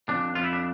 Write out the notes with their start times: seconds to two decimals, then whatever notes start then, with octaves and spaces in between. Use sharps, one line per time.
0.09 F2 D4
0.35 F2 F4
0.44 E4
0.53 D4